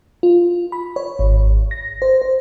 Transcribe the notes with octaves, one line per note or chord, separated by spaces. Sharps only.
F4
B5
C#5
G#1
A#6
C5
C5